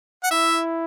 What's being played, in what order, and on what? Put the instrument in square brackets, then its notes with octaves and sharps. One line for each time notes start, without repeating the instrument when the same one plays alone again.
[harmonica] F#5
[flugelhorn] E4 [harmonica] E5